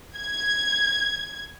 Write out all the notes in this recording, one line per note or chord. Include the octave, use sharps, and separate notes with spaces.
G#6